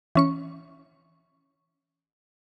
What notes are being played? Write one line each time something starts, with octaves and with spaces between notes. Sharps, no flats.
E3 C#4 C#6